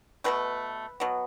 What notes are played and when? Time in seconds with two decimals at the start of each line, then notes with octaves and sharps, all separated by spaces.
0.24 B2 F#3 A3 B4
1.00 B2 F#3 B3